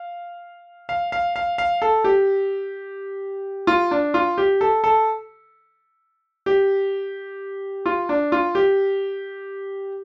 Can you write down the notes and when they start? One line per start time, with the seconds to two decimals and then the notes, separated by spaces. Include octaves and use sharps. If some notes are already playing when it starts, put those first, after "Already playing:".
Already playing: F5
0.89 F5
1.12 F5
1.36 F5
1.58 F5
1.82 A4
2.04 G4
3.67 F4
3.91 D4
4.14 F4
4.38 G4
4.61 A4
4.84 A4
6.46 G4
7.86 F4
8.09 D4
8.32 F4
8.55 G4